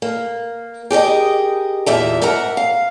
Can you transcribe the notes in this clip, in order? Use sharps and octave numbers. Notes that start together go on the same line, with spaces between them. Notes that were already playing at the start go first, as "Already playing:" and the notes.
A#3
G4 G#4 A#4 D#5
E2 A#2 E5 A#5
G#2 A#4 E5 F#5 A#5
F5